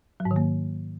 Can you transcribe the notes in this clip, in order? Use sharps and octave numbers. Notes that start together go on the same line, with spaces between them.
F#3
G#2
D#3
A#3